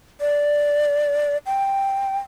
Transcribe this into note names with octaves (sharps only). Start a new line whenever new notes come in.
D5
G5